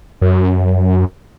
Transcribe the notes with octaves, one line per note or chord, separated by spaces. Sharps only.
F#2